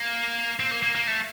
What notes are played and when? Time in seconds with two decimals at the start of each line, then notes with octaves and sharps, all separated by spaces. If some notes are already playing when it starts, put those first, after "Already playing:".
Already playing: A#3
0.60 C4
0.71 A#3
0.83 A#3
0.95 A#3
1.07 A3